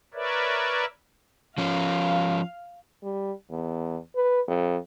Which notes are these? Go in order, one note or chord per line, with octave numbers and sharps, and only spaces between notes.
A#4 B4 C#5 D5 E5
F3 C#4 F5
G3
E2
B4
F2